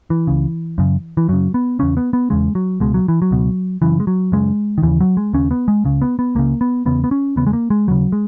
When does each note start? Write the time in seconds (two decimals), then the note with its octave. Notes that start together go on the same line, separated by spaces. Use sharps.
0.10 E3
0.27 C#2 C#3
0.78 F#2 C#3
1.17 E3
1.29 F#2 C#3 F#3
1.54 B3
1.79 E2 C#3 C#4
1.97 B3
2.13 B3
2.30 E2 C#3 G#3
2.55 F#3
2.80 C#2 B2 G#3
2.94 F#3
3.08 E3
3.22 F#3
3.31 C#2 B2
3.82 F#2 C#3 E3
4.00 G#3
4.07 F#3
4.32 F#2 C#3 G#3
4.78 D#3
4.83 D#2 C#3 E3
5.01 F#3
5.17 G#3
5.33 D#2 C#3 C#4
5.51 B3
5.68 G#3
5.85 C#2 C#3
6.02 B3
6.19 B3
6.35 C#2 C#3 A#3
6.61 B3
6.86 E2 C#3 B3
7.04 B3
7.11 C#4
7.36 E2 C#3 B3
7.47 G#3
7.53 A#3
7.70 G#3
7.87 D#2 C#3 F#3
8.12 G#3